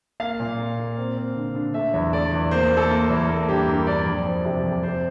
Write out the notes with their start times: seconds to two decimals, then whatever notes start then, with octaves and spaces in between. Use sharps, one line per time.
0.20 A#3 F5
0.40 A#2
0.58 A#3
0.78 A#3
0.97 C4
1.16 C4
1.36 D3
1.55 D3
1.74 A3 E5
1.94 E2
2.13 A3 D5
2.33 E2
2.51 A#3 C5
2.71 A#3
2.77 A4
2.90 A#3
3.10 E2
3.29 A#3
3.48 G2 G4
3.68 G2 A#4
3.86 G2 D5
4.06 F2
4.26 F3
4.45 C3
4.64 F2
4.83 C4 C5